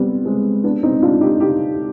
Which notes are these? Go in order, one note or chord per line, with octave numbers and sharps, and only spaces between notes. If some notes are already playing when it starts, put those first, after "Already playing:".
Already playing: G3 B3 C4
G#3 C4
B3 D4
C4 D#4
D4 F4
D#4 G4
D#4 G4